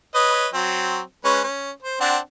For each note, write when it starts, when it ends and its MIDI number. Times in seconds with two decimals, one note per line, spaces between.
0.15 0.48 71
0.15 0.48 73
0.15 0.48 75
0.54 1.01 54
0.54 1.01 60
1.25 1.42 56
1.25 1.42 61
1.25 1.42 71
1.44 1.71 61
1.82 2.00 72
2.01 2.18 60
2.01 2.18 62
2.01 2.18 78